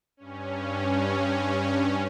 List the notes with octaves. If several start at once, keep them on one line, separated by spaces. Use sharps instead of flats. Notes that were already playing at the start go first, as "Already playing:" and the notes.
G2 C#4